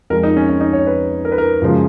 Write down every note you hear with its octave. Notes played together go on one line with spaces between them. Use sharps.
F2 F3 G#3 A#4
D#4
C#4
C#4
D#4
C#5
B4
A#4
B4
A#4
F#2 C#3 F3 G#3